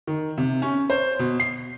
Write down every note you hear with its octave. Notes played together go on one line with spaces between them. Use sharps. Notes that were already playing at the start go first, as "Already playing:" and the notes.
D#3
C3
C#4
C5
B2
C7